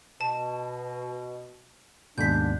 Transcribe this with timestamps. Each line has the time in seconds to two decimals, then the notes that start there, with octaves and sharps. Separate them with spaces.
0.21 B2 A5
2.18 D#2 G#2 B2 D3 D4 G6 B6